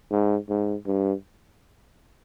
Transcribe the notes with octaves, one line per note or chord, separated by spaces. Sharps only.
G#2
G#2
G2